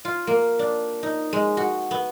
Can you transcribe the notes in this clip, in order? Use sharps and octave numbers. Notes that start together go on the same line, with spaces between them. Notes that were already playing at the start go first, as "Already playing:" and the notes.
F4
A#3
D4
D#4
G#3
F#4
B3